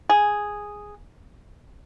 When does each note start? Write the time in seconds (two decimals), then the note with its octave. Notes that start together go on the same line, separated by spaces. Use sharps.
0.09 G#4